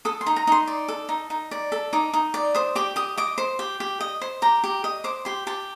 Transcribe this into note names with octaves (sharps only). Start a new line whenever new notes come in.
A4 D#6
C6
D#4
A#5
D#4 C6
D5
A4
D#4
D#4
D5
A4
D#4 D6
D#4
D5
C5 D#6
G4 D6
G4 D#6
D#5 D6
C5
G4
G4
D#5
C5
G4 A#5
G4
D#5
C5 D6
G4 C6
G4 A5